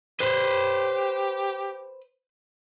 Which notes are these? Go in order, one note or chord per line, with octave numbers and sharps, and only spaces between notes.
G4 B4 C5